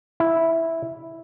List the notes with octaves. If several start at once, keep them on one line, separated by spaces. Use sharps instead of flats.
E4